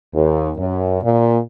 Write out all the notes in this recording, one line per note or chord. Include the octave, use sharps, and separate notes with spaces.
D#2
F#2
A#2